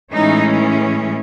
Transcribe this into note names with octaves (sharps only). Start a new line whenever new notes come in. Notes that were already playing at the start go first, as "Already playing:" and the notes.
A2 E3 G#3 C#4 D#4